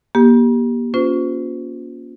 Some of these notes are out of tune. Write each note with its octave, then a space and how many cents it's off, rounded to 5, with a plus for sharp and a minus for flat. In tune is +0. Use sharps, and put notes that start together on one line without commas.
A#3 +40 G4 +0
C#4 +25 F4 +25 C5 -35